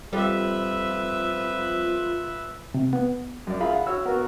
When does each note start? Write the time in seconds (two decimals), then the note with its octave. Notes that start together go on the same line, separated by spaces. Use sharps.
0.13 F2 G3 F4 B4 E5
2.74 C3
2.93 B3
3.47 F#2 D5
3.60 F4 G#4 E5 F5 B5
3.73 F#5
3.86 F#4 C#5 E6
4.06 B3 F#4 A#4